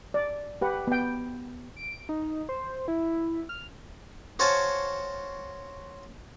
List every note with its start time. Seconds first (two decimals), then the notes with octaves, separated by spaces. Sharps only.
0.14 D5
0.61 G4 B4 F#5
0.87 B3 G5
1.76 D7
2.09 D#4
2.49 C5
2.88 E4
3.49 F6
4.39 F#4 C5 C#5 F5 G#5 A5